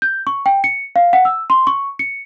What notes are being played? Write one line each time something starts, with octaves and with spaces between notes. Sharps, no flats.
G6
C#6
G5
C#7
F5
F#5
E6
C6
C#6
C#7